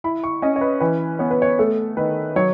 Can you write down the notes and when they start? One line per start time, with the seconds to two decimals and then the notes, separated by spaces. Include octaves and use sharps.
0.04 E4 B5
0.24 C#6
0.42 C#4 D#5
0.56 C#5
0.61 B4
0.80 E3 B4
1.19 B3 C#5
1.31 B4
1.42 C#5
1.59 A3 A4
1.97 D#3 B4
2.36 F#3 C#5